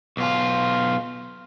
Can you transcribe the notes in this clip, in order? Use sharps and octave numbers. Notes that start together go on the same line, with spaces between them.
B1 F4